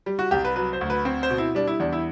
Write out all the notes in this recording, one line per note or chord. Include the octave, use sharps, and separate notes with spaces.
G3
F#4
C2 G4
B4
F#3 B4
C5
D2
B4
C4
C5
B2
E4
G3 D4
E4
E2 D4
E4